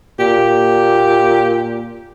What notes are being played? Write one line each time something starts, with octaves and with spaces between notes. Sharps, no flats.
A#2 G4